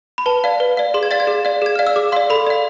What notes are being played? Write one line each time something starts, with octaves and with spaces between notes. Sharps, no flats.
B5
B4 A5
D5 F5
B4
D5 F5
G#4 C6
G#6
D5 F5 A6
G#6
G#4
D5 F5
G#4 G#6
D5 F5 F6
E6
G#4 D6
D5 F5 C6
A4 B5
D5 F5